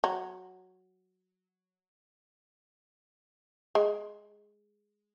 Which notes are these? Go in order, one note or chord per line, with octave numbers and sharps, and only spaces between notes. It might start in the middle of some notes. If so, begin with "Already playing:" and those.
F#3
G#3